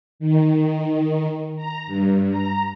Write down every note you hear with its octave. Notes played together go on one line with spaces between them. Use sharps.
D#3
A#5
G2
A#5